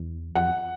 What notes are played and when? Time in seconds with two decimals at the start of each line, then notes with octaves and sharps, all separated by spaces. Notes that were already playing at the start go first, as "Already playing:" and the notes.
Already playing: E2
0.35 F2 F#5